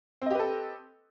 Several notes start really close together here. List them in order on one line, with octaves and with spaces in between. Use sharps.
C4 D#5 G4 B4 A4